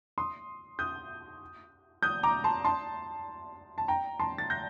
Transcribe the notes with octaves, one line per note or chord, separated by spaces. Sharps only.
C6 D#6
D#6 G6
D#6 G6
A#5 D6
A5 C6
A5 C6
A5
G5 A#5
A5 C6
A6
G6 A#6